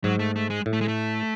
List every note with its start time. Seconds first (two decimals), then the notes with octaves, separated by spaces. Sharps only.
0.04 G#2 F#3
0.19 A3
0.36 A3
0.50 G#3
0.66 A2
0.73 A3
0.81 G#3
0.88 A3